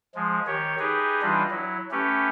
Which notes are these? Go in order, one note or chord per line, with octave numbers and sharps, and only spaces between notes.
F3 G#3
D#3 G4 C#5
D#4 G4 G#4 B4
E3 G3 D4 F4 B4 D#5
F#3 E4
A3 C#4 G4 B4